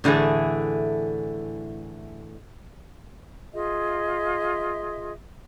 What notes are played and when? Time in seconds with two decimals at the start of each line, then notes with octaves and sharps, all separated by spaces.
0.04 A2 D3 E3 A3 G#4
3.53 F4 G#4 D#5 E5